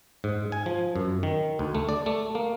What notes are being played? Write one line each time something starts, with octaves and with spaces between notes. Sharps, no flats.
G#2
G#5
F3
F#2
D#3
D2
A3
D5
A3
A#3